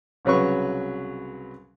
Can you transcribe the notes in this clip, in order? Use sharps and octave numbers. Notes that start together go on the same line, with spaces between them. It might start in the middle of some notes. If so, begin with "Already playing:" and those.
C2 C#3 F#3 B4 C#6